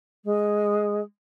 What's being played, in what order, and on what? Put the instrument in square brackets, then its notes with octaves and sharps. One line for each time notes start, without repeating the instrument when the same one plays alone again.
[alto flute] G#3